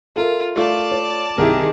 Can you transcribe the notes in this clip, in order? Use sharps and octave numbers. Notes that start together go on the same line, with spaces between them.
F4 A4 A#4 E5
A3 F4 D5 A5
C#5
C2 D#3 E4 G4 G#4 A#4